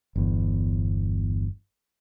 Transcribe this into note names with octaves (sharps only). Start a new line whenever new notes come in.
G1 E2